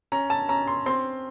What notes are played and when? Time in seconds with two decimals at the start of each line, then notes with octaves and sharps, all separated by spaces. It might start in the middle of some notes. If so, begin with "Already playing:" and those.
0.12 C#4 A#5
0.30 A5
0.49 C#4 A#5
0.68 C6
0.86 C4 C6